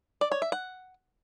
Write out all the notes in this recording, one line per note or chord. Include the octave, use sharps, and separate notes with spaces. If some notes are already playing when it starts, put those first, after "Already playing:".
D5
C#5
E5
F#5